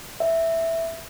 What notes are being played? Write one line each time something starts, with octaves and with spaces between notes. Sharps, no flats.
E5